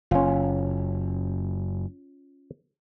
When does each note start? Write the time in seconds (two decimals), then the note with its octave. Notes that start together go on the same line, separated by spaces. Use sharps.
0.11 F#1 C#4 F4